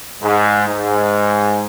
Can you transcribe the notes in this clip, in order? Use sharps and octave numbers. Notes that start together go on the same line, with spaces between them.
G#2
G#2